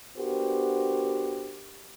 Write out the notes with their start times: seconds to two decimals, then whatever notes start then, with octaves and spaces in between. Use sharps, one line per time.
0.17 B3 D4 F#4 G4 A#4 C5